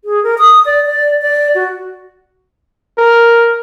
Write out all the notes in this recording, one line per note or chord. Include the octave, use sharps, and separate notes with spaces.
G#4
A#4
D#6
D5
D5
D5
F#4
A#4